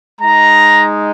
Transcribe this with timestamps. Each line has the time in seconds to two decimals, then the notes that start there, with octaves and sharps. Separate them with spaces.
0.21 G#3 D#4 A#5